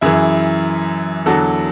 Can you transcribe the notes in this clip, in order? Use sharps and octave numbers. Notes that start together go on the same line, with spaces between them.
F#2 E3 E4 G#4
E2 D3 F#3 F#4 A4